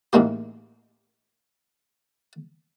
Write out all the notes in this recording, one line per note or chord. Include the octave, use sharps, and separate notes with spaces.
A1 G#2 G#3 A#3 G4